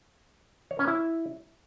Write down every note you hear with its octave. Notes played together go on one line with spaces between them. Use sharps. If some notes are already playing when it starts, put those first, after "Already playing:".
C#5
C#4
E4